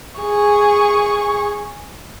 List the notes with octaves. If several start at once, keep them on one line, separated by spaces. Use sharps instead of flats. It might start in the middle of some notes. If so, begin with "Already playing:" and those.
G#4 C#6